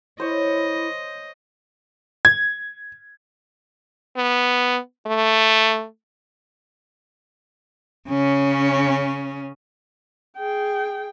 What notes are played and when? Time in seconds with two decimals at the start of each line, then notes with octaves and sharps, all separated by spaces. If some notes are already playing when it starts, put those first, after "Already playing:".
0.20 E4 C5 C#5 D#5
2.25 G#6
4.17 B3
5.06 A3
8.09 C#3 C#4
10.37 G#4 G5